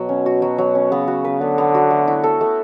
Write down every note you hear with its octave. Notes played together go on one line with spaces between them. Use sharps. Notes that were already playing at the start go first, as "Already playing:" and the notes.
Already playing: B2 F#3
C#4
F#4
F#3
F#3
C#4
C#3 B3
F#4
B4
D3 B3
B3
F#4
A3
E4
A4
A3